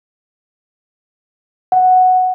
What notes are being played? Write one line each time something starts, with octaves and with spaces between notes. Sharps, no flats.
F#5